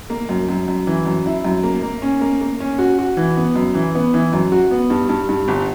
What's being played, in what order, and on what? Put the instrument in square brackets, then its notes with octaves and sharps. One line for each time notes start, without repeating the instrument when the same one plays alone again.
[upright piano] A#3
F#2
F#2
F#2
E3
F#2
E4
F#2
A#3
A#3
C#4
A#3
A#3
C#4
F#4
F#4
E3
B3
F#2
E3
B3
E3
F#2
F#4
B3
G2
G2
G2
G1